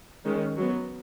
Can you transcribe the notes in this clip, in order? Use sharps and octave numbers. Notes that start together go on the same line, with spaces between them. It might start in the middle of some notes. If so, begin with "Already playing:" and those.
D#3 G#3 C#4
F#3 B3